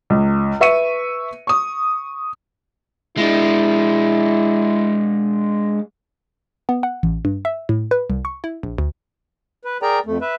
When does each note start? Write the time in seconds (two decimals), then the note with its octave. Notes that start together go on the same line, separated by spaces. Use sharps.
0.10 C#2
0.61 B4 E5 C#6 C#7 D#7
1.47 C#6 D#6
3.17 G#3 D4 E4
6.69 B3
6.83 F#5
7.03 A1
7.25 G2
7.45 E5
7.69 A2
7.91 B4
8.10 C2
8.25 C#6
8.44 E4
8.63 A#1
8.78 D2
9.65 B4
9.82 G#4 A#4 D5 G5 A#5
10.06 F2 A3
10.21 B4 E5